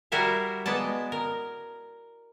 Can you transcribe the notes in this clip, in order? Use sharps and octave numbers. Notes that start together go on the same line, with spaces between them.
G3 E4 F#4 A#4 E5 F5
G#3 B3 D5 A5
A#4